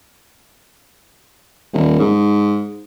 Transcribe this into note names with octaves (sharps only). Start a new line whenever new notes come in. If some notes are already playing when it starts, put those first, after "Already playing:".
D#1
G#2